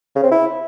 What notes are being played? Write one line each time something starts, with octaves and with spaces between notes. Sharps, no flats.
C#3
C4
E4